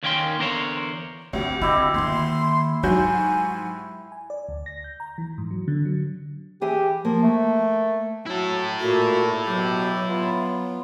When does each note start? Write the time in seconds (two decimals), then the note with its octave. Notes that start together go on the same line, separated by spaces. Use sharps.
0.03 D#2 D#3 A#3 C#4 G5 C6
0.39 E2 D3 A#4 C5 C#5
1.33 D2 C4 G4
1.62 D3 C4 E4 G4 D#5
1.94 D#3 A#3 C6
2.83 G#2 F#3 F#4 G#5 G6
4.12 G#5
4.30 D5
4.49 D2
4.66 A#6
4.84 G6
5.00 A#5
5.18 E3
5.38 G#2
5.51 F#3
5.68 D3
5.85 F#3
6.61 E3 G4 G#4 E5
7.05 F3 A#3
7.22 A3
8.26 F#3 E4 A4
8.80 A#2 A3 A#3 F#4
9.46 B2 F#3 G4 G5
10.07 B3 F4